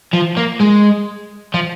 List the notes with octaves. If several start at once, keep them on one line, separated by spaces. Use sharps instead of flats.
F3
A#3
G#3
F3